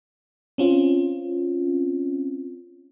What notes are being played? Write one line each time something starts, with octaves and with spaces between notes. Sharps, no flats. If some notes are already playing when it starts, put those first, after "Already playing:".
C4 C#4 F4